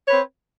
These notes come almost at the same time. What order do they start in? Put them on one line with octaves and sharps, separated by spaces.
C#5 B4 C4